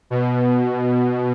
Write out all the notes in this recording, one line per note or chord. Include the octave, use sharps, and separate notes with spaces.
B2